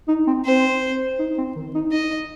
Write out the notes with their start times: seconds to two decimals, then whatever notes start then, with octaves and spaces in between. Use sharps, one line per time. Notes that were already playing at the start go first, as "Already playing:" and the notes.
0.08 D#4
0.27 C4
0.45 C4 C5
1.19 D#4
1.38 C4
1.56 D#3
1.74 D#4
1.92 D#4 D#5